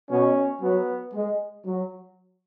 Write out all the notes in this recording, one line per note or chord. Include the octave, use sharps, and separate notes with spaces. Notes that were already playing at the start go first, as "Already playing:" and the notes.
B2 C#4
F#3 B3
G#3
F#3